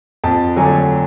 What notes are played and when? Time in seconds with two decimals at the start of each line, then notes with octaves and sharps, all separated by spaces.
0.24 F2 A5
0.56 D3 F#3 A3 D4 G#5